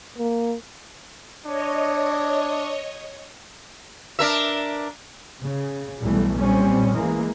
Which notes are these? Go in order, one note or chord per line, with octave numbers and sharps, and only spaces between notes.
A#3
D4 C#5 D#5
D4 A#4 E5
C#3
B1 A2 E3 G3 A3
A#2 G3 C4 C#4
E3 G#3 A#3